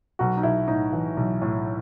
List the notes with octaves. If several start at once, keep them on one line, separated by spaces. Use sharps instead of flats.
B1 F#4
D#4
B1 E4
A2 D#4
E3
B1
A2